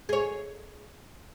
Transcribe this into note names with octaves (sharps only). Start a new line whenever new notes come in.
G#4 C#5